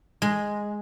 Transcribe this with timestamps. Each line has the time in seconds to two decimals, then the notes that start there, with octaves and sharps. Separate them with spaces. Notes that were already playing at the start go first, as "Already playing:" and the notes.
0.22 G#3